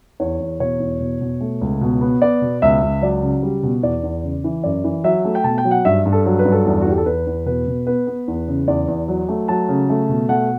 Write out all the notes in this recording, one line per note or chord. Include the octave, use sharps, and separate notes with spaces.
E2 C#5
E2
B2 C#5
E2
B2
B2
A3
C#2
B2
B3
B3 D5
B2
C#2 E5
C#2
F#3 D5
C#3
G3
B2
E2 D5
E2
C#3
E3
F#2 D5
E3
F#3 E5
A3
G5
B2 A5
G5
F#3
F#5
G2 E5
G2
A4
F#3 A4
B4
G2
A4
E2
F#4
E2 G4
A4
E2 B4
E2
B2 B4
B2
B3 B4
B3
E2
C#3
E2 D5
E2
F#3
A3
F#3 A5
C#3
A3
B2
A3 F#5